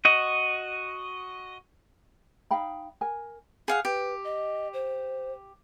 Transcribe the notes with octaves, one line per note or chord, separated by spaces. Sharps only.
F#4 D#5
D#4 F5 G5 B5
A#4 G#5
G#4 F5 F#5
G4 B4
D#5
C5